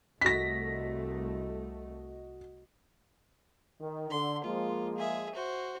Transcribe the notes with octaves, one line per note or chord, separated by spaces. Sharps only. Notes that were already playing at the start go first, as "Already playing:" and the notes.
C2 A3 F#4 D#5 A#6 B6
D#3
D3 C6
F3 G#3 A#3 F4
G#4 E5
F#4 C5